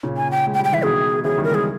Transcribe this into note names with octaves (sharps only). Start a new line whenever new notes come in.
A#2 C#3
G#5
G5
G#3
G5
G3
G5
E3 E5
B2 D#3 G#4
C#3 E3 G#4
D#3 G3
A#4
E3 G#3 G#4